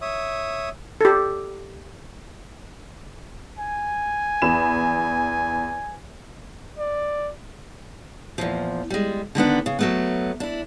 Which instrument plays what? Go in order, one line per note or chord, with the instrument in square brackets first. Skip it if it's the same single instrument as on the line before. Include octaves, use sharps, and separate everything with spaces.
[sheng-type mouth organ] C#5 E5 D#6
[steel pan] G4 A4
[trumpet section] G#5
[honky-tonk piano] E2 B5 E7
[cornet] D5
[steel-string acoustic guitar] E2 A#2 F3
G3 G#3
D3 D#3 B3 D4
C#3
F#3 A3 B3
D4 E4